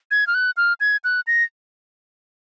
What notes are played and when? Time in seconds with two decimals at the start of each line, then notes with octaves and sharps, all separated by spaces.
0.11 G#6
0.27 F6
0.34 F#6
0.57 F6
0.80 G#6
1.04 F#6
1.27 A#6